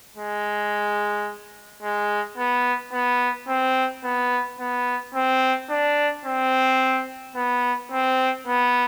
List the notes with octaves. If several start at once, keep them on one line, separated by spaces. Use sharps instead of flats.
G#3
G#3
B3
B3
C4
B3
B3
C4
D4
C4
B3
C4
B3